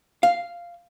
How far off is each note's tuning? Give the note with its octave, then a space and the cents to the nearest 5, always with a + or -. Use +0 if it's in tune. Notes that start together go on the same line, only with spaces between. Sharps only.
F5 -5